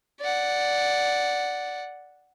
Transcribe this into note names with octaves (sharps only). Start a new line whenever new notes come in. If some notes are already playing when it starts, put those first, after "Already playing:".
D5 F#5